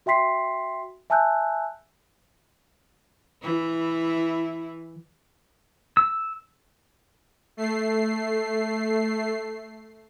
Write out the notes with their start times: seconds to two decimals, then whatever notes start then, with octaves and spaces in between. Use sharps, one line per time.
0.06 F#4 E5 G5 C6 B6 C7
1.10 E5 G#5 A5 E6 F#6 G6
3.42 E3 E4
5.97 E6
7.57 A3 C7